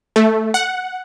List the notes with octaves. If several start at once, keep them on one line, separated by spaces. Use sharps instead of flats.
A3
F#5